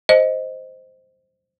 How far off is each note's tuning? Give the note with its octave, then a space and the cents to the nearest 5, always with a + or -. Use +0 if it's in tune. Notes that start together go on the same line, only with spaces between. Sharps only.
C5 +0 D#5 +0